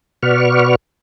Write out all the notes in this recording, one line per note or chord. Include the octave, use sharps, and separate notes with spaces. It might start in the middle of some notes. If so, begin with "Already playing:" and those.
B2 F#4 B4 D5 C#6 F6